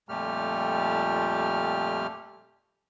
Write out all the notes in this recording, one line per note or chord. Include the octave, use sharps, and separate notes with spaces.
F2 A#2 G3 A3 G4 F6